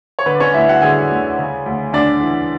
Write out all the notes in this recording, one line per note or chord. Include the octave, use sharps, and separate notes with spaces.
C#5
D3 B4
D5
C#4 C#5
D2 E4 E5
F#4 F#5
D3 G#4 G#5
D2
C#3
D2
D2 D4 D5
E3